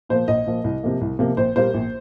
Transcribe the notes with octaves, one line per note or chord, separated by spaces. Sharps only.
A#2 F3 A#3 C5
A#1 D#5
A#2 F3 A#3
C2
C3 F3 A#3
C2
C3 F3 A#3
A#1 C5
A#2 G3 A#3 C5
A#1